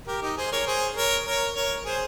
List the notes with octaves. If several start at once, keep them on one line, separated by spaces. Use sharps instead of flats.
G4 A#4
D#4 G4
G#4 C5
A#4 C#5
G#4 C5
A#4 C#5
A#4 C#5
A#4 C#5
G#4 C5